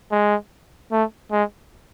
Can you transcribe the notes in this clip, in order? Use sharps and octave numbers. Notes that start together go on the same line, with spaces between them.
G#3
A3
G#3